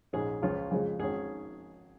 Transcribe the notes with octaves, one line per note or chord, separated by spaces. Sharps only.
A#1 G#2 G#3 C#4 G#4
C#2 C#3 F3 C#4 F4
F2 C#3 G#3
G#1 G#2 D#3 C#4 G#4